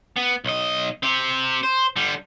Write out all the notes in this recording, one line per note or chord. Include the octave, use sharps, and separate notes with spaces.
B3
B1 D#5
C4 G4
C5
D3 G3